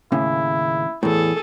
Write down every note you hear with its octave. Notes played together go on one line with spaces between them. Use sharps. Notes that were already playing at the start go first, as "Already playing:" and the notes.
D#2 A2 C#3 E4
E2 A2 G#4 A4